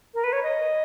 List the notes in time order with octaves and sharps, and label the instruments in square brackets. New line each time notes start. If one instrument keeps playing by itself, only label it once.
[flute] A#4
B4
C#5
D#5